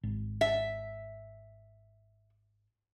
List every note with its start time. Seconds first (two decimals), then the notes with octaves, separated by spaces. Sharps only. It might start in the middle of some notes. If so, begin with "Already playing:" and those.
0.03 G#1
0.41 E5